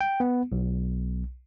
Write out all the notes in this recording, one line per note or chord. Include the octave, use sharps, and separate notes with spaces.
G5
B3
B1